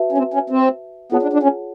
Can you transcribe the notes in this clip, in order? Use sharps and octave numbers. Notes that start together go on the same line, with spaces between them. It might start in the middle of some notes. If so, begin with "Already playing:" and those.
Already playing: F#4 B4 E5 A5
C#4
C4
C#4
C4
B3 F4 G#4 C#5 F#5 A5
D4
D4
C#4